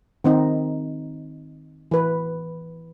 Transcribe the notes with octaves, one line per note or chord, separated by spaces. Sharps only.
D#3 C4 D#4
E3 B4